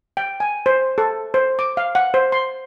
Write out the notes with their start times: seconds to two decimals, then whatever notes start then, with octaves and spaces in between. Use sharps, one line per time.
0.17 G5
0.40 G#5
0.66 C5
0.98 A4
1.34 C5
1.59 D6
1.77 F5
1.95 F#5
2.14 C5
2.32 C6